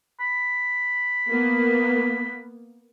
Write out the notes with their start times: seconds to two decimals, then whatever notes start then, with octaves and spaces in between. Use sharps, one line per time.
0.20 B5
1.30 A#3 B3